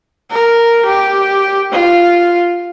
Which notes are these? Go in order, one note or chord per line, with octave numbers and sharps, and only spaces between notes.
A#4
G4
F4